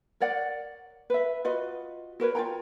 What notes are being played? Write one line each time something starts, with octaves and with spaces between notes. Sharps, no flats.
A#4 C#5 D5 F#5
B4 E5
F4 F#4 B4 D#5
F#4 A#4 B4 C#5
F4 C#5 G5 A#5